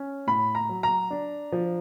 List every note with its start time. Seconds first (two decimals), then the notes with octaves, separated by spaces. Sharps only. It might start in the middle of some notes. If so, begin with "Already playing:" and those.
Already playing: C#4
0.27 A2 B5
0.55 A#5
0.69 F#3
0.83 A#5
1.10 D4
1.52 F3